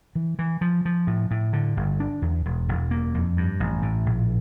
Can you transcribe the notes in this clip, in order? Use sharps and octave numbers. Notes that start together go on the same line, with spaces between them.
E3
E3
F3
F3
A2
A2
D3
G1
D4
E2
E1
E1
A#3
F2
G2
A1
A2
A#1